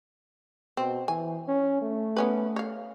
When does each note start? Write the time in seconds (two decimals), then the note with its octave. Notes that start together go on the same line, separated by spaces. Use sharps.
0.77 B2 C4
1.08 E3 G#5
1.48 C#4
1.82 A3
2.17 B3 C#4 B4
2.56 C#5 F5